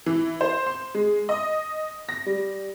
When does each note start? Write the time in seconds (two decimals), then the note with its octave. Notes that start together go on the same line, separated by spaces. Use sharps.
0.06 E3
0.41 C5
0.67 C6
0.95 G#3
1.29 D#5
2.09 A#6
2.26 G3